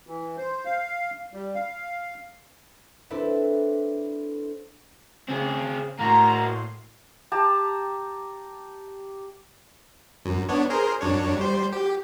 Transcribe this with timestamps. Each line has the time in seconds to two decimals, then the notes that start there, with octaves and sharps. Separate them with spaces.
0.07 E3
0.37 C5
0.65 F5
1.34 G3
1.55 F5
3.10 C4 D4 E4 A4 B4
5.29 C#3 C4 G#4
6.00 A2 A#3 F#4 A#5 C6
7.32 G4 A5 A#5
10.25 F#2
10.49 B3 D4 C#5
10.70 G#4 A#4 C5
11.01 F#2 D4 C#5
11.37 G3 C5
11.73 G4